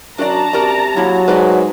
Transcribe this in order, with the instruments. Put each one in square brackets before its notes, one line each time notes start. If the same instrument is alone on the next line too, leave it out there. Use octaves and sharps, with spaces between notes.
[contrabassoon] F#2 [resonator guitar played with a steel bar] D4 F#4 D5 [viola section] A5 A#5
[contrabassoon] C3 [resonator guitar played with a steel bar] F#4 A#4 D5
[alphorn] F#3 [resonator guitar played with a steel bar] A#3 E4
[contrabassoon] G#2 [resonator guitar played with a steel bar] B4 D5 D#5